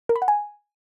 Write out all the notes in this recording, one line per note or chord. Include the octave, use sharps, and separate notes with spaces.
A#4
B5
F#5
G#5